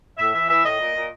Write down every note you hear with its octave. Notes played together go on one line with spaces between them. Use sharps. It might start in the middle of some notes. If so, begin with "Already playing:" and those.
A2 E5
E3 E5
E3 E5
A2 D#5
A#2
A#2